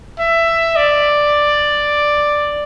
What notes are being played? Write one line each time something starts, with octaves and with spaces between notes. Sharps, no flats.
E5
D5